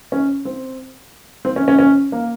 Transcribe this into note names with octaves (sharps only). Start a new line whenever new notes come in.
C#4
C4
C4
C#4
C#4
C#4
A#3